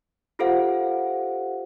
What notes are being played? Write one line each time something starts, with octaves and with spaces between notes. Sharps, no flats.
F4 G4 A4 C5 F5 F#5